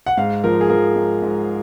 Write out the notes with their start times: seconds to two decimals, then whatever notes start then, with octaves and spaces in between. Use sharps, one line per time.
0.06 F#5
0.17 G#2 F5
0.44 F3 A#4
0.61 G#4
0.70 F3 A#4
0.96 G#2
1.22 G#2